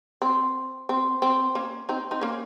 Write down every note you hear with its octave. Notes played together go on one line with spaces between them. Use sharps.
C4
C4
C4
A#3 C#4
C4 D#4
C4 D#4
A#3 C#4